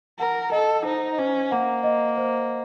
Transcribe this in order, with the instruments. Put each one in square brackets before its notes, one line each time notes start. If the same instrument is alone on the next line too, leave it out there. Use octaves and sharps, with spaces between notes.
[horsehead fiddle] A#4 [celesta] F#5
[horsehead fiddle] A4 [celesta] D#5
[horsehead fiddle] D#4 [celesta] C5
[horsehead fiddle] C#4 [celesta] C5
[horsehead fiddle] A#3 [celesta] F#5
[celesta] D#5
C5